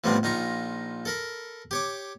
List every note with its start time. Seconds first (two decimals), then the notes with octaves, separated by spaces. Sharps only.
0.04 A2 C3 F3 G3 B3 C4
0.23 A#1 D#4 F4 A#5 C#6
1.05 A4 A#4 B5
1.71 G4 C#5 D6